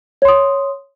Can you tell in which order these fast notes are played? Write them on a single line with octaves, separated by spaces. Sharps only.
C#5 C6 D#6